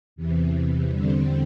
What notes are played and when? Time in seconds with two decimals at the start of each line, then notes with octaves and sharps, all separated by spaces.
0.16 E2 C3 E3
0.88 E2 D3 G3 C4